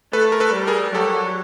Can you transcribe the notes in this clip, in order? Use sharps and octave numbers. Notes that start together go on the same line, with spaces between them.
A3 A4 B4
A#4
A4 B4
G3
G#4 A#4
F#3 G4 A4